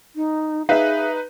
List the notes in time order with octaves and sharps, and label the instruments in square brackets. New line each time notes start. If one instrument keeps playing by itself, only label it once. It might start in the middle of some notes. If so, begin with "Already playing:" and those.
[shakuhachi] D#4
[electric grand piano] D#4 B4 [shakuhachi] G#4 [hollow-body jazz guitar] E5 F5